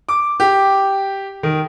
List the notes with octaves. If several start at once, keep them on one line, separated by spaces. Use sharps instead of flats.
D6
G4
D#3